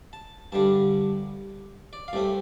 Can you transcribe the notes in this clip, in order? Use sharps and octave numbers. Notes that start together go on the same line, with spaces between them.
A5
G2 D3 G3 D4 A5
D5
F5
C2 C3 A3 C4 D5